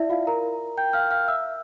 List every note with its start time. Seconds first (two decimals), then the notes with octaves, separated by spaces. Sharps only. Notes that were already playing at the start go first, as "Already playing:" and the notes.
Already playing: E4 D5 E5
0.10 F4 F5
0.27 A#4 A#5
0.77 G5 G6
0.93 F5 F6
1.11 F5 F6
1.28 E5 E6